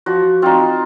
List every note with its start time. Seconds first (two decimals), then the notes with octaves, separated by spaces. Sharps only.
0.06 F3 F#4
0.42 C4 D#4 F4